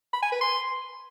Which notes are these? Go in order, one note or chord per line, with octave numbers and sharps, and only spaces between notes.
B5
G#5
B4
C6